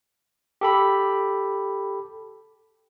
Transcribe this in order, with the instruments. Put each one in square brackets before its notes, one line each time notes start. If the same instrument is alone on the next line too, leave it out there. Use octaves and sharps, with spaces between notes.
[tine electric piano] G4 A4 B5